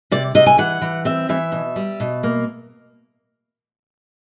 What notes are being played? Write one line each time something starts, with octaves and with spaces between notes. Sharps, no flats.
C3 D5
C3 D#5
G#5
E3 F#5
E3
C4 E5
E3 E5
B2
G3
B2
A#3